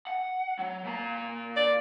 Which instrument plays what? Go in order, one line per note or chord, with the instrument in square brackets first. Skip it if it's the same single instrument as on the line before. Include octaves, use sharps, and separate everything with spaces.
[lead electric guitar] F#5
F#3
A#2 A#5
[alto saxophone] D5